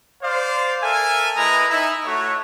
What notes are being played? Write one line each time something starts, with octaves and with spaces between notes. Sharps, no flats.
C5 D5 F5
A4 A#4 E5 G#5
G#3 E4 B4 D#5 A#5
D#4 E4
A3 F#4 C#5